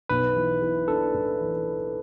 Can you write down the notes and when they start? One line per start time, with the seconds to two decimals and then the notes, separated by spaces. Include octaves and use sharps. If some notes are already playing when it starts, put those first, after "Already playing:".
0.09 B1 B4
0.35 E3
0.62 E3
0.88 D4 A4
1.14 A2
1.40 E3